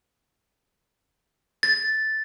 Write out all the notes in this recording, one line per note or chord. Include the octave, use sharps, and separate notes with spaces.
A6